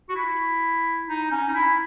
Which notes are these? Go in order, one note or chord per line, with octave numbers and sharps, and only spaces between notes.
F#4
E4
D#4
C#4
D#4
E4